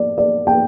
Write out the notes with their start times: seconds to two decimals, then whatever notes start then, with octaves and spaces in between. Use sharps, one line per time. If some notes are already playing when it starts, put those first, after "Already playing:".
Already playing: D5
0.18 D5
0.47 G5